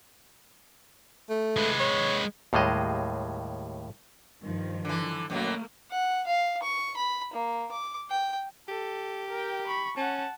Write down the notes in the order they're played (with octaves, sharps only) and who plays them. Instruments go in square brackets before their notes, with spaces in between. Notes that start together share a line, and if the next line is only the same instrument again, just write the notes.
[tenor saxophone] A3
[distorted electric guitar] G#3 B4
[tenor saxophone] C#5
[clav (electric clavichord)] D#2 A2 G3 G#3 D#5
[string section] G2 D#3 F3
[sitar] D3 E3
[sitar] F#2 B2 F#3 [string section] A3 A#3
[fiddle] F#5
F5
C#6
B5
A#3
D6
G5
[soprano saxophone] G4 [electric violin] A4
[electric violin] A#4 G5
B5 C#6
[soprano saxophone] C#4 [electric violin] F#5 A5